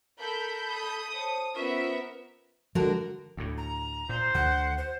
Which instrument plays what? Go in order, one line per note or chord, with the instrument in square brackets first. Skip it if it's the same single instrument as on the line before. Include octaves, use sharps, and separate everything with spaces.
[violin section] A4 B5 G6 [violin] A#4
[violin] D#6
[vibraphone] C5 C#5 A5
[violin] B3 A#4 [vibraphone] C#4 F4 C5 [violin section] E5
[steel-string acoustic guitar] D3 F#4 A#4 [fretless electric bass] F3 G#3
[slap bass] D2 A2
[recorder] A#5
[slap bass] A#2 [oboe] C5
[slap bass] D2 D3 D#3 [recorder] F#5
[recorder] C5